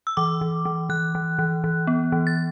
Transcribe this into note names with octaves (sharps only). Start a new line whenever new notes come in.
E6
E3 D6
E3
E3
E3 F#6
E3
E3
E3
B3
E3
A6